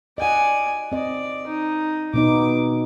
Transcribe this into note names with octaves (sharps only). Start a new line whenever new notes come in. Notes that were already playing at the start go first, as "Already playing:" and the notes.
D5 D#5 F#5 G#5
C4 D5 D#5
D#4
B2 B3 D#4 D6